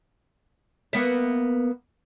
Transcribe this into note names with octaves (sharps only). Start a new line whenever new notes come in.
A#3 B3 E5